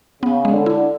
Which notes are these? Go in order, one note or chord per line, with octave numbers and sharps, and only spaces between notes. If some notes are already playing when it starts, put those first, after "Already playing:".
C#3 B3
G#3
D3
E4